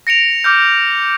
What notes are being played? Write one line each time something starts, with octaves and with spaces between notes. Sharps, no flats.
A#6 C#7 D7 F7
D6 F6 G6